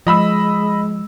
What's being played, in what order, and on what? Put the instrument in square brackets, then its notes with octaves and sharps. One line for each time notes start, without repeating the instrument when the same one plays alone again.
[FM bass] F3 [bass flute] G#3 [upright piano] D#5 B5 E6